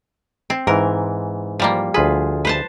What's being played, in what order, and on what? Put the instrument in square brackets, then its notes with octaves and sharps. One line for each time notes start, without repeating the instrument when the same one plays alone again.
[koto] C4
[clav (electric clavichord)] G#2 E3 [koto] A#4
[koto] F3 G3 A#3
[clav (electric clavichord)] D2 F4 G#4 [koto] B4
[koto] B4 C5 A5